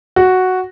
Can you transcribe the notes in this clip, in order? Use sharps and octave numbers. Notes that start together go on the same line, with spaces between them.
F#4